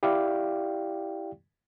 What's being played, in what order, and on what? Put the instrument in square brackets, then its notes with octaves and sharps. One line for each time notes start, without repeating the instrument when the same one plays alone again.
[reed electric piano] E4 G4 D5 F5 G5